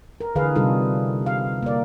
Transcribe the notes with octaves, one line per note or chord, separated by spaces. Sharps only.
A#4
D3 E3 G#4 B4 F5
C3 G3 D#4 F4 A4
F5
A#3 D5